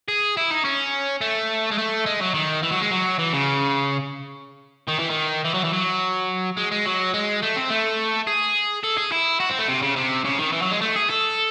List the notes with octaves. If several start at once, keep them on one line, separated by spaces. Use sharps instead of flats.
G#4
E4
D#4
C#4
A3
G#3
A3
G#3
F#3
D#3
E3
F#3
G#3
F#3
E3
C#3
D#3
E3
D#3
E3
F#3
E3
F#3
G#3
G#3
F#3
G#3
A3
C4
A3
G#4
A4
G#4
E4
F#4
C4
A3
C3
C#3
C3
C#3
D#3
E3
F#3
G#3
A3
G#4
A4